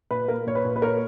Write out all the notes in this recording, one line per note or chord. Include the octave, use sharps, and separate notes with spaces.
A#2 B4
A#3 A#4
A#2 C#5
B4
A#2
B4
A#3 A#4 C#5